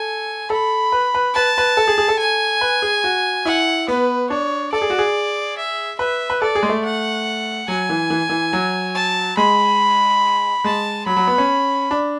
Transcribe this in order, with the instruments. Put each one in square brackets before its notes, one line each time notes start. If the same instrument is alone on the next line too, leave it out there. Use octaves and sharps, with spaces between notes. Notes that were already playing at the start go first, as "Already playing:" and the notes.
Already playing: [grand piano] A4 [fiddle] G#5
[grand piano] A4 [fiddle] B5
[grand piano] B4
B4
[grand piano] B4 [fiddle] A5
[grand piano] B4
A4
G#4
G#4
A4
[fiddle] G#5
[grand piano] B4
G#4
F#4
[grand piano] E4 [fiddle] F#5
[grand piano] B3 [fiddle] B4
[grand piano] D4 [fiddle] C#5
[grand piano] A4 [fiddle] D5
[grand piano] G#4
F#4
G#4
[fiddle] E5
[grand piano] B4 [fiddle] E5
[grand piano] B4
[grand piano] A4 [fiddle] D5
[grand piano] G#4
G#3
A3
[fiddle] F#5
[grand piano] F#3 [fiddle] G#5
[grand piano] E3
E3
E3
F#3
[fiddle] A5
[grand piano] G#3 [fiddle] B5
[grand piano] G#3 [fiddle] A5
[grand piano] F#3 [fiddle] B5
[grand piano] F#3
B3
C#4
D4